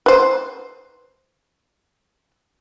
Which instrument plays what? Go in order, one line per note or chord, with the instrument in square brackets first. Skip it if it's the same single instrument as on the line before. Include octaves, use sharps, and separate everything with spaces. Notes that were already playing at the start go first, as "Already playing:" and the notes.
[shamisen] B4 C5